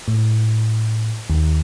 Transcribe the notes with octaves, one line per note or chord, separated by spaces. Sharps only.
A2
D#2